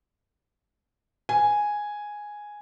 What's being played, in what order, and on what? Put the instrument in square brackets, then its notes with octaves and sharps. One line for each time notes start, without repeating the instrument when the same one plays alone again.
[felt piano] G#5